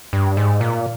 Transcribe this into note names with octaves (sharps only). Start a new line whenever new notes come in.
G2
G#2
A#2